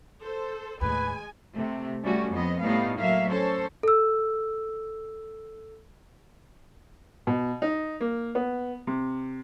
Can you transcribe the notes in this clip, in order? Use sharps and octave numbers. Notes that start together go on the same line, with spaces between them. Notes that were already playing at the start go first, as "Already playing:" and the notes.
A4 C5
D#2 A2 G#3 B4 G#5
C3 A3
G3 A3 C#4 F#4
F2 B3 D#5
A2 G3 A3 B3 D#4 F5
F#3 A#3 E5 F5
C#4 A4 C5
A4 E6
B2
D#4
A#3
B3
C3